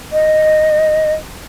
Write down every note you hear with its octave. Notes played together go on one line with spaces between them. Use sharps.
D#5